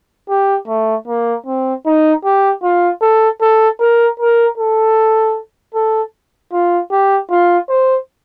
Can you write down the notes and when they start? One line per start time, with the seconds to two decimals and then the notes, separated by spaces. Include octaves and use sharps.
0.29 G4
0.68 A3
1.07 A#3
1.46 C4
1.86 D#4
2.25 G4
2.63 F4
3.02 A4
3.41 A4
3.80 A#4
4.20 A#4
4.58 A4
5.75 A4
6.53 F4
6.92 G4
7.31 F4
7.69 C5